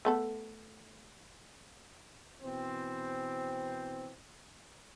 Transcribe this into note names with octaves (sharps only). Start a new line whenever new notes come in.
A3 B3 A4
B2 E3 C4